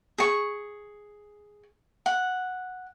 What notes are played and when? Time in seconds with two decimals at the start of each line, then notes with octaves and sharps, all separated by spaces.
0.18 G#4 C#6
2.06 F#5